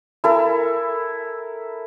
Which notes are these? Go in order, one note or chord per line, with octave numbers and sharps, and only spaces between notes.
E4 A4 A#4